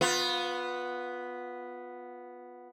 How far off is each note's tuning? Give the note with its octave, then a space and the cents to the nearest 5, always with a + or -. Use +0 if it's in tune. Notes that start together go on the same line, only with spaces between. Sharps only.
B3 +0 F4 +25